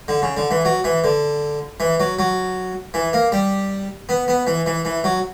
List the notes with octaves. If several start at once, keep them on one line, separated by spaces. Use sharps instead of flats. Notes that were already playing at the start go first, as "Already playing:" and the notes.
D3
C#3
D3
E3
F#3
E3
D3
E3
F#3
F#3
E3
A#3
G3
B3
B3
E3
E3
E3
F#3